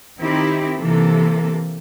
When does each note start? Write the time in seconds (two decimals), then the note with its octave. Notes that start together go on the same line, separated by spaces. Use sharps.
0.20 D#3 C4 D#4 E4 G4
0.77 C3 E3 A#3 A4